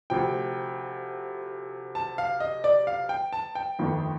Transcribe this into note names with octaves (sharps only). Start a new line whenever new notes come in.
D2 C3 F3 G5
A5
F5
D#5
D5
F5
G5
A5
G5
G1 F2 D#3 A3